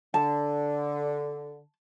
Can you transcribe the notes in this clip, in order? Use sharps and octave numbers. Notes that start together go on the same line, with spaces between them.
D3 A5